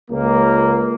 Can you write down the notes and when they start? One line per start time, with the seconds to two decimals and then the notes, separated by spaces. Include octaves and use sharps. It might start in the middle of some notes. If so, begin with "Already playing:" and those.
0.11 C#2 A#3